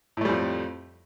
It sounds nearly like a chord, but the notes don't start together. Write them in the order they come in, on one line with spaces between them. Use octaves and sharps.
A2 A3 G3 F2